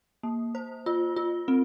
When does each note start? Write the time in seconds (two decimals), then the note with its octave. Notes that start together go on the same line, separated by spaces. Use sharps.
0.23 A#3
0.55 C5
0.86 F4
1.16 F4
1.48 C4